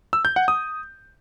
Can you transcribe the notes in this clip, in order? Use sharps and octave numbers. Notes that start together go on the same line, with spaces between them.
E6
G6
F#5
D#6